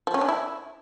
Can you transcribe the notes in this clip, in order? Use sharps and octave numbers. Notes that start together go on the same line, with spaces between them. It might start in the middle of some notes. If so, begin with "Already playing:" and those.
F3
C#4
D4
E4